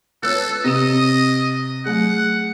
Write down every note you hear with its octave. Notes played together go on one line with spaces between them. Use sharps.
F4 A4 B4 C#5 E6 F#6
C3 C4 D#5 D#6 E7
F#3 A3 G#4 F#5